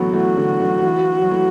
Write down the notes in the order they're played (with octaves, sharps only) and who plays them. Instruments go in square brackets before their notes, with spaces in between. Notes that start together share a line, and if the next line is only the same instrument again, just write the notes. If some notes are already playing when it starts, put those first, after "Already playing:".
Already playing: [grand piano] D3 E3 F#3 A3 B3 [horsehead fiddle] F#4
[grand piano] E3 A3
D3 F#3
D3 F#3
F#3
E3
F#3
E3 A3